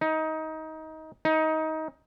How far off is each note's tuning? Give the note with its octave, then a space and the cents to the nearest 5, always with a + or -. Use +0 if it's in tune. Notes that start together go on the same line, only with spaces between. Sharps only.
D#4 +20
D#4 +20